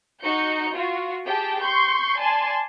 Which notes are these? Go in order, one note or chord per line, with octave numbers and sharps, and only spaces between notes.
D#4 F#4 G6 C#7
F4 F#4
G4 G#4 G5 A5
C6 C#6 G6
D5 G#5 A5 C6